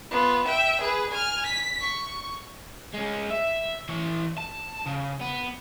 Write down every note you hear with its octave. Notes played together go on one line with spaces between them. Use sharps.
B3 F4
E5 G5
G#4 B4
G#5 F6
B6
C#6
G#3 C#4
E5
E3 C#5
A5
C#3
B3